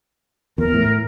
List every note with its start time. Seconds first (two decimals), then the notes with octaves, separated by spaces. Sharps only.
0.58 E2 A#4
0.74 A2